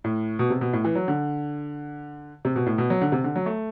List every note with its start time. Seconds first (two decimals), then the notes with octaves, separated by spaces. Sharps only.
0.04 A2
0.39 B2
0.50 C3
0.61 B2
0.73 A2
0.85 E3
0.95 F#3
1.08 D3
2.45 C3
2.56 B2
2.66 A2
2.78 B2
2.90 F#3
3.01 D3
3.12 C3
3.24 D3
3.36 F#3
3.46 A3